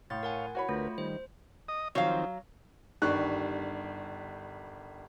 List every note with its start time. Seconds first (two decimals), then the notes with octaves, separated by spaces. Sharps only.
0.10 A2 A3 C#5 F5 C6 A6
0.23 A#4 F#5 G#5
0.55 F#4 C#5 B5
0.69 D2 A3 F4 A#4 B4
0.98 D#3 G3 C5
1.68 D#5 D#6
1.95 D#3 F3 F#3 C4 F5
3.02 G1 D#3 G3 D4 C#6 F#6